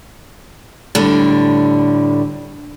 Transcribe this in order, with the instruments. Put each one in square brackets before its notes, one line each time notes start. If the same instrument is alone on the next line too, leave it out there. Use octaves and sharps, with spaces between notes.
[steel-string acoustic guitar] A2 D3 G3